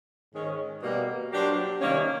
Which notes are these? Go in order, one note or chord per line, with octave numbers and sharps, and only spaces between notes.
G#2 D#3 G#3 C#4
B2 G3 A#3
F#3 A#3 D4 G4 C5
C3 D#3 G3 A#3 C#4